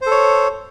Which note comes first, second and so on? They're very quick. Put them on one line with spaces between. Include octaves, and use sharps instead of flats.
C5 A4 C#5